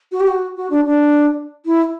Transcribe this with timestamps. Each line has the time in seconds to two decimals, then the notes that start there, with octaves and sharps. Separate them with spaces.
0.12 F#4
0.20 G4
0.28 F#4
0.57 F#4
0.70 D4
0.85 D4
1.66 E4